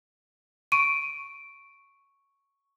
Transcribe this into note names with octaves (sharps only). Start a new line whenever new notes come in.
C#6 D7 D#7